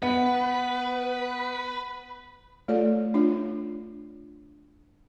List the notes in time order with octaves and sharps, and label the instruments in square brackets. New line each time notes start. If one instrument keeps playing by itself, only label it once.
[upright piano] B3 [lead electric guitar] B4
[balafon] A3 F4 A4 C#5 D5
D4 F4 C#5